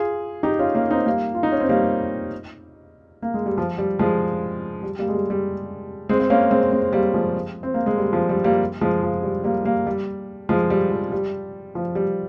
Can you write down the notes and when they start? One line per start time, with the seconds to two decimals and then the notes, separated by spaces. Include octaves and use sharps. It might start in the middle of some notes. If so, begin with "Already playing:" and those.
Already playing: F4 G#4
0.43 D#4 G4
0.59 C#4 F4
0.75 A#3 C#4
0.90 C4 D#4
1.06 G3 A#3
1.35 F4
1.43 D#4
1.52 C#4
1.60 C4
1.69 G3 A#3
3.22 A#3
3.34 G#3
3.46 G3
3.58 F3
3.78 G3
3.99 F3 G#3
4.83 G3
4.99 G3 A#3
5.08 G#3
5.15 G3
5.30 G3
6.09 G#3 C4
6.20 C4
6.30 A#3 C#4
6.51 G#3 C4
6.72 G#3 C4
6.93 G3 A#3
7.14 F3 G#3
7.63 C4
7.74 A#3
7.86 G#3
7.98 G3
8.13 F3
8.29 G3
8.44 G3 A#3
8.81 F3 G#3
9.03 F3
9.23 G3
9.44 G3 A#3
9.65 G3 A#3
9.87 G3
10.49 F3 G#3
10.70 G3
10.91 F3
11.12 G3
11.75 F3
11.95 G3